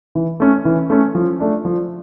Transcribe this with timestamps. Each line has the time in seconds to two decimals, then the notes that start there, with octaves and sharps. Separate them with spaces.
0.15 E3
0.40 A3 C#4
0.65 E3
0.90 A3 C#4
1.15 F3
1.40 A3 D4
1.65 F3